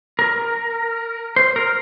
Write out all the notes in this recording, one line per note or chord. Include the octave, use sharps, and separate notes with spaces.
A#4
C5
A#4